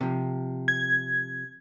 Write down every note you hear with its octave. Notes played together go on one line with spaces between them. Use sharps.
C3 F3
G#6